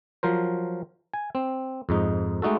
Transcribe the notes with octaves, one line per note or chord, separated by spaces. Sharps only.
F3 F#3 A#4 C5
G#5
C4
F2 G#2 D#4
G#3 A3 D#4 F#4 A4